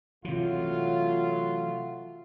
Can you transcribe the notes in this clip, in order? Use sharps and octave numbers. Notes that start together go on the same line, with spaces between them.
C3 E3 F#3 A3 F4